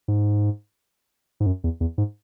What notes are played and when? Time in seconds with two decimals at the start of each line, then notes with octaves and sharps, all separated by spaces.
0.08 G#2
1.40 G#2
1.46 F#2
1.64 E2
1.81 E2
1.98 G#2